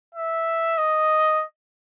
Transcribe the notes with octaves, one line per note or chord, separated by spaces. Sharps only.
E5
D#5